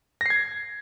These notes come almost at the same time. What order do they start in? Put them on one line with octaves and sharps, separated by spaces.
A#6 C7 G#6